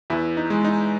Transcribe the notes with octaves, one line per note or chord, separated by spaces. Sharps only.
E2 E4
D#4
G#3
D#4